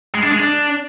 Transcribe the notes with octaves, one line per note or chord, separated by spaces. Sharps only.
G#3
D4
G#3
D4